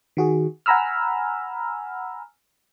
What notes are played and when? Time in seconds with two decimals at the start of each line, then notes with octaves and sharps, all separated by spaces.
0.17 D#3 F#4 G#4
0.66 F#5 G#5 A#5 B5 E6 F6